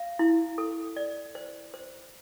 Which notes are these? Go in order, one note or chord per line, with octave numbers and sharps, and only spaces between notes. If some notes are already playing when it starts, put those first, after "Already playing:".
Already playing: F5
E4
A4
D5
C5
C5